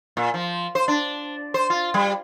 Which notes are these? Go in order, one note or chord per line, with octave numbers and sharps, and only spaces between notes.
A#2
F3
C5
D4
C5
F4
G3